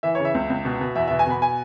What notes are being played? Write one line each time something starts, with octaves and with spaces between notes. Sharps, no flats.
E3 E5
C#3 C#5
E5
C#2
C#2
B2
B2
E2 E5
B2 E5
G#5
B2 B5
G#5